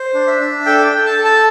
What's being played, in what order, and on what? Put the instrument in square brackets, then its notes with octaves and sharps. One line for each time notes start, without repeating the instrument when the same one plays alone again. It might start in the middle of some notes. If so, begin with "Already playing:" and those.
Already playing: [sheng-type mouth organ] C5
D4
E5
D4
A4 G5
G5
A4
A5
A4
A5